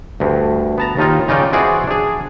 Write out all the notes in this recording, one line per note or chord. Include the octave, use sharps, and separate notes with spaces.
D2 G2
B3 A5 A#5
D#2 D#3 D#4 F4
C#3 D#4 F4 D5 G5
E3 F#4 G#4 C5 D5
D4 G#4